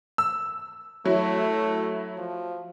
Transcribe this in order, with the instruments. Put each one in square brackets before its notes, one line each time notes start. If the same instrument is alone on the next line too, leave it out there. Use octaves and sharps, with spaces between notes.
[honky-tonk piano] E6
[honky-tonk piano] F#3 E4 [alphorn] A3
[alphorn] F3